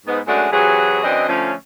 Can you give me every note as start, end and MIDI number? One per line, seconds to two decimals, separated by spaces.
0.07 0.20 44
0.07 0.20 59
0.28 0.48 42
0.28 0.48 56
0.28 0.48 57
0.28 0.48 62
0.28 0.48 68
0.28 0.48 78
0.52 1.03 48
0.52 1.03 52
0.52 1.03 54
0.52 1.03 66
0.52 1.03 68
1.03 1.26 42
1.03 1.26 52
1.03 1.26 60
1.03 1.26 62
1.03 1.26 75
1.29 1.52 50
1.29 1.52 53
1.29 1.52 57
1.29 1.52 61